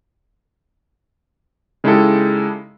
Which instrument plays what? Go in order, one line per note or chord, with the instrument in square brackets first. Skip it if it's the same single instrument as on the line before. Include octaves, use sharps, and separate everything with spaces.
[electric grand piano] C#3 G#3 D#4 E4 G4 A4